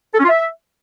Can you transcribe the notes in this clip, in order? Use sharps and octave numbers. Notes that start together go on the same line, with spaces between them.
A4
C#4
F4
E5